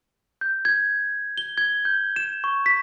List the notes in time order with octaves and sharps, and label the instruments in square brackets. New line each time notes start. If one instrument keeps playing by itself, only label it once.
[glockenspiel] G6
G#6
G7
G#6
G6
E7
C#6
B6